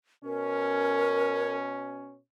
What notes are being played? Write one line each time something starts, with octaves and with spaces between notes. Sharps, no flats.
B2 C#4 A#4